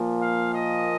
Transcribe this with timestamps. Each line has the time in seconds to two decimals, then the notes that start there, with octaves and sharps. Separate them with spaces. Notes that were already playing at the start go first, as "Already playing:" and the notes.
Already playing: A#2 F3 A#3
0.21 F5
0.54 D#5